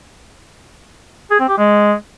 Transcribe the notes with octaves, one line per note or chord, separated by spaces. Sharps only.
G#4
C4
G4
G#3